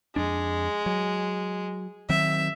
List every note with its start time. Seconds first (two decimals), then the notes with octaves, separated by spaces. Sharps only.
0.16 F2 G#3 D4
0.86 F#3
2.09 D#3 F#3 C4 E5